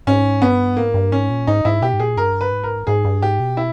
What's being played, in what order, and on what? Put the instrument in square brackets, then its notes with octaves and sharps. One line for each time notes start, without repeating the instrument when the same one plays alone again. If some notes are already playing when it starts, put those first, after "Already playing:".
[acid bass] G#2 [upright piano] C#4
[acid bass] G2 [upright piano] B3
[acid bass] G#2 [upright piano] A#3
[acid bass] G2
[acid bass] G#2 [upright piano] C#4
[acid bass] A#2
[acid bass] G#2 [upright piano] D#4
[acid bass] G#2 [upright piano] E4
[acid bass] B2 [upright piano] G4
[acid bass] G#2
[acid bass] A#2 [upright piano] G#4
[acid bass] G2 [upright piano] A#4
[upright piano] B4
[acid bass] G#2
[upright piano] A#4
[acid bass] G#2 [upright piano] G#4
[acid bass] G2
[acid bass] G#2 [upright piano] G4
[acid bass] B2
[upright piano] E4